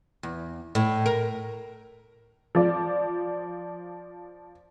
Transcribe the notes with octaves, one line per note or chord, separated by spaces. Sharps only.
E2
A2
A#4
F3 D5